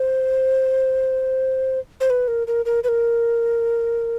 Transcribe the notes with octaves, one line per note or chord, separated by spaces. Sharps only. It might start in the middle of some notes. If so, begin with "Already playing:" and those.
Already playing: C5
C5
B4
A#4
A#4
A#4
B4
A#4